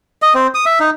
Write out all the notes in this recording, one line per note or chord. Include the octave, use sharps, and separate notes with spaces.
D#5
C4
D#6
E5
D#4